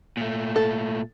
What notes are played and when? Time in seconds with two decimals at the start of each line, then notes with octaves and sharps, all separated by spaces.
0.17 A#2 A3
0.56 A4